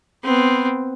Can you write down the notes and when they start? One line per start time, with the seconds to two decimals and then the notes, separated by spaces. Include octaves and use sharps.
0.23 B3 C4